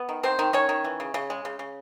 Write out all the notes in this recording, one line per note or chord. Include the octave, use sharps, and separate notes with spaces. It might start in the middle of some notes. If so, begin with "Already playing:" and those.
Already playing: B3
D#3
D#3 C4 C5
D#3
D#3 C#4 C#5
D#3
E3
C#3
C#3
G#3
C#3
C#3